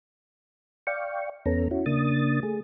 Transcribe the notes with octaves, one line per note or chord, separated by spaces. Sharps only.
D5 F5 G5 C#6
E2 B3 C#4 A4 A#5
C#4 E4 F#4
C#3 A#3 D4 D#6 A6
A3 G#4